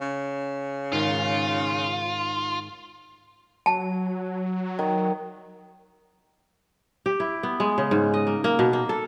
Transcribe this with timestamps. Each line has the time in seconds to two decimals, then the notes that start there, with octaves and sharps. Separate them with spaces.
0.01 C#3
0.93 G#2 D#3 F4
3.66 F#3 A5
4.79 D#3
7.06 G4
7.20 E4
7.43 B3
7.60 G#3
7.78 C#3
7.91 G#2
8.14 D#5
8.27 A#3
8.44 A#3
8.59 B2
8.73 A#3
8.89 A4